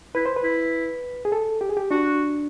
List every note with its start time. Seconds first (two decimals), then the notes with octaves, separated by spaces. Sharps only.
0.15 E4 B4
0.26 C5
0.36 B4
0.44 E4
1.25 G#4
1.32 A4
1.61 G4
1.69 G#4
1.77 G4
1.91 D4 F#4